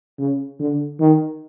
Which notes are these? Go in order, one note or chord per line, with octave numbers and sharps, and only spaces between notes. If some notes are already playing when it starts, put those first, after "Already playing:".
C#3
D3
D#3